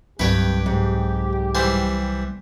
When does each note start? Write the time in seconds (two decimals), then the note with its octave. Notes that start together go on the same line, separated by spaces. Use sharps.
0.19 C2 G2 F#3 C4 G4 B4 C#5 G5
0.66 G#2
1.55 E3 G3 C5